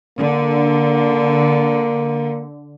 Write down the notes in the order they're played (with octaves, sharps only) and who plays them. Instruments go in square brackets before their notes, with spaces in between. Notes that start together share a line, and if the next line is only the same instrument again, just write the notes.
[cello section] D3 [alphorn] A#3